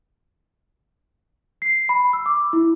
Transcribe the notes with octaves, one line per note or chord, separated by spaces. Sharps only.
C7
B5
E6
D6
E4